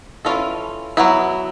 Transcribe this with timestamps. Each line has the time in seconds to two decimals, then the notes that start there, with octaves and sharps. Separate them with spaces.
0.25 E3 G#3 C#4 F4 A4
0.97 F#3 B3 E4